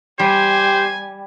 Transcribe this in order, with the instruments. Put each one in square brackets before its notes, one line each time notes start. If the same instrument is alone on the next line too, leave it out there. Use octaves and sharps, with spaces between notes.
[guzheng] G3 [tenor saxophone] G4 [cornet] C5 [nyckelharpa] G#5